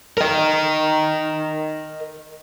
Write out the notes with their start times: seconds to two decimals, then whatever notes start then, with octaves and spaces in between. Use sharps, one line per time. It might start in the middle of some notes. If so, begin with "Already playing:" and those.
0.18 A#4 D#5